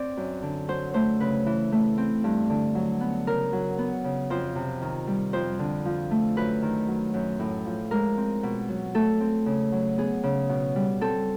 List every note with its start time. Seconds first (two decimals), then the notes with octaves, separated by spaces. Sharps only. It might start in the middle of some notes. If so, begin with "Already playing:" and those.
Already playing: C4 D5
0.17 F#2
0.42 D3
0.68 F#3 C5
0.94 A3 C5
1.20 C#3 B4
1.46 E3
1.72 A3
1.98 C4
2.24 G2
2.50 D3
2.75 F#3
3.01 B3
3.27 C#3 A#4
3.53 F#3
3.78 B3
4.04 C#3
4.30 F2 C5
4.56 C3
4.82 D#3
5.07 G3
5.33 F2 C5
5.59 D3
5.85 F3
6.11 A3
6.36 F#2 B4
6.62 D#3
6.88 F#3
7.14 F#2
7.40 A2
7.66 F3
7.91 G#3 A#4
8.17 C4
8.43 B2
8.69 F#3
8.94 A3 A4
9.20 C4
9.46 C#3
9.72 F#3
9.98 B3 G#4
10.23 C#3
10.49 B2
10.76 G3
11.01 C4 A4